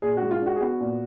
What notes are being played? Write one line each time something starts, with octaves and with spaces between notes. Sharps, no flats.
A#2 G#4
F#4
G#3
F4
D4 F#4
G#4
B3 F#4
A#2